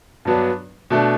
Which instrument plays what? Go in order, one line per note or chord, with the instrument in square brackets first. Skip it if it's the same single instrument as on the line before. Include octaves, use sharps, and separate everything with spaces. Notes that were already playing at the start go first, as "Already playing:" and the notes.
[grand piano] G2 F#3 B3 D4
B2 A3 D4